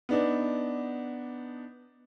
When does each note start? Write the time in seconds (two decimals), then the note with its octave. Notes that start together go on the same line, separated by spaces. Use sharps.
0.09 B3 D4 D#4